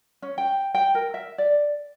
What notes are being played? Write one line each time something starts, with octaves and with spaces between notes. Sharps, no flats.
C#4
G5
G5
A#4
E5
D5